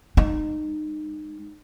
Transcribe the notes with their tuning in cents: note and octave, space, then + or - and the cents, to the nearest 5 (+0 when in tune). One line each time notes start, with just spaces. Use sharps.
G#3 -10 D#4 -25